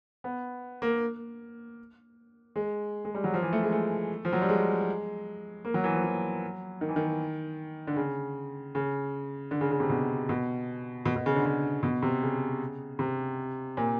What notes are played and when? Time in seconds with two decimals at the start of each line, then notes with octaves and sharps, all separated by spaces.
0.24 B3
0.82 A#3
2.56 G#3
3.05 G#3
3.15 G3
3.24 F#3
3.34 F3
3.42 E3
3.53 A3
3.63 G#3
3.72 A3
4.25 F3
4.33 F#3
4.42 G3
4.49 G#3
5.65 A#3
5.74 F#3
5.84 E3
5.94 F3
6.04 F#3
6.81 D#3
6.89 E3
6.96 D#3
7.87 D3
7.96 C#3
8.75 C#3
9.51 D3
9.61 C#3
9.71 C#3
9.80 C3
9.90 B2
10.29 B2
11.06 B2
11.16 B2
11.26 C#3
11.35 D3
11.45 C#3
11.83 B2
12.02 C3
12.23 C#3
12.99 C3
13.77 A#2